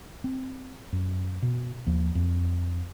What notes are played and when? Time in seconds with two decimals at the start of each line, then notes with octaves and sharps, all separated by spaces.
0.24 C4
0.93 F#2
1.42 B2
1.87 D#2 F3
2.15 F2